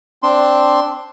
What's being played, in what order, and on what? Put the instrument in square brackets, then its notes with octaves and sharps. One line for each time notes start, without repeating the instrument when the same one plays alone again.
[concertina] C4 D4 C6